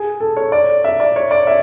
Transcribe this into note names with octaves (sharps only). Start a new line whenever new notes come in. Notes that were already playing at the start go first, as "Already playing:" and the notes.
Already playing: G#4
A4
C#5
D5
E5
D5
C#5
D5
E5